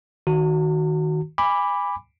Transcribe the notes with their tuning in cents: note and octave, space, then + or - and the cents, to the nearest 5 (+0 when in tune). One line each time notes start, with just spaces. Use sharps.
D#3 +0 F#4 +5 A#5 -45
G#5 -25 B5 +0 D6 +0